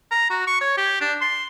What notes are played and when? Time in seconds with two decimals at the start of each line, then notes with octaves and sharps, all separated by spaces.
0.11 A#5
0.30 F#4
0.47 C#6
0.61 C#5
0.77 G4
1.01 D4
1.21 C6